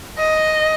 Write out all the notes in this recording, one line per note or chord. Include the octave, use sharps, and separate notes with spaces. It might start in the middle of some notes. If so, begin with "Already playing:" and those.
D#5